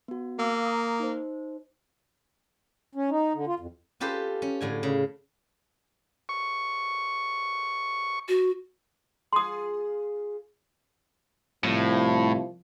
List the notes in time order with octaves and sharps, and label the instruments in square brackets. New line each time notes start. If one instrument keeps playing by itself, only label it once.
[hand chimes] B3 F#4
[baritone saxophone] A#3 [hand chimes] F5 D6 E6
[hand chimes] A#5 D#6
D#4 C5
[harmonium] C#4
D#4
D3
F4
F2
[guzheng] C#4 F4 G4 A4 B4 C5
C#4
A2 D3 G#5
C#3
[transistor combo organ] C#6
[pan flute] F#4
[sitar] F4 G#4 [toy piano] C6 D#6
[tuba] C2 [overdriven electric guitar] A2 [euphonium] F3